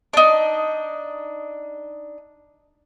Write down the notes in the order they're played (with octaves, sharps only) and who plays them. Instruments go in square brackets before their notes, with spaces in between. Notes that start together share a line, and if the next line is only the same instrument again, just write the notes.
[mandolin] D4 D#4